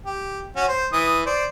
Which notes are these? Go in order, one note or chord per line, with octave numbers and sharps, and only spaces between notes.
G4
C#4 F#4
C5
E3 D#6
C5 D5